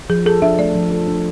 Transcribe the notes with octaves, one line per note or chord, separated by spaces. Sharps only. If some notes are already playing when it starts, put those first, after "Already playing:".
F3 G#4
G#4 A4
D4 E5
A3 D5
F3
A4
D4